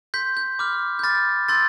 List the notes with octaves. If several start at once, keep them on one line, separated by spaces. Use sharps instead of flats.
C6 G6 B6
G6
B5 D6 F6
G6
B5 D6 F6 A6
C6 E6 G6 A6